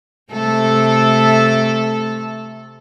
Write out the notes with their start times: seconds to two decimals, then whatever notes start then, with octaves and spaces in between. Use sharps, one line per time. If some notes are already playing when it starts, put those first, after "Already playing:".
0.32 C3 A3 A4